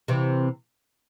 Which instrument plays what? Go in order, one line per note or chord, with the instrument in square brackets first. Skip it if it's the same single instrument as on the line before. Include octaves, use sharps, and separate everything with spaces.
[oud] C3 E3